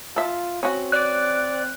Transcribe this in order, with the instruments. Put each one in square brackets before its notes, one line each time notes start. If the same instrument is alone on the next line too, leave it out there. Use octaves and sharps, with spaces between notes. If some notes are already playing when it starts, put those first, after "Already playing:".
[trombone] F4 [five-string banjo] A4 E5
[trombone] C4 [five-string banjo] C#4 F#4
[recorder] D5 [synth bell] F#6